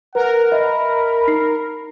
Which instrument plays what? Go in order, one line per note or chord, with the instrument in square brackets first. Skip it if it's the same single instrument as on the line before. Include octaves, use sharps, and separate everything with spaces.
[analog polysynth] A#4 [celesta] B4 [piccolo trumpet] F#5
[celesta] D#5 E5 [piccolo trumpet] B5
[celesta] D#4 C7